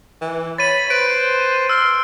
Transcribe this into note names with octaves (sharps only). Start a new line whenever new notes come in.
E3
C#5 B5 A6 D#7
B4 C5 D7
C6 E6 F6